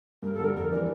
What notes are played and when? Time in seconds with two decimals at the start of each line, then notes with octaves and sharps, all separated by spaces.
0.23 G2 A#4
0.34 A4
0.40 D3 G3 A#4
0.55 F2 A#4
0.72 E3 G3 D4 A#4